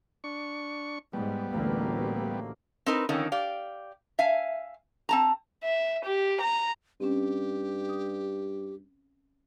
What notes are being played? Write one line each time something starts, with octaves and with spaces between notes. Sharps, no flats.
D4 C#6
G#2 G3 B3
A1 D2 A#3
C4 D#4 A#4 B4
F2 D3 D#3 C#4
G4 D5 F5
E5 F5 G#5
C4 A5 A#5
E5
G4
A#5
G2 C4 C#4 G4
D#6